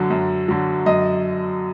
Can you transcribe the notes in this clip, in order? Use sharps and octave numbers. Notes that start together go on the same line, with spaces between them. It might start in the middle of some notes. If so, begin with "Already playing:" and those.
Already playing: F#2 D3 F#3
F#2
D3 F#3
F#2 D#5